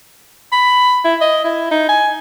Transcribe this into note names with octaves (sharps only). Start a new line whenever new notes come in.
B5
E4
D#5
E4
D#4
G#5